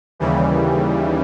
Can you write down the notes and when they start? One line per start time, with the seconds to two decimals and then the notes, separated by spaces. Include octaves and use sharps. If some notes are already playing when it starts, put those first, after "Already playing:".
0.19 D#2 C#3 E3 G3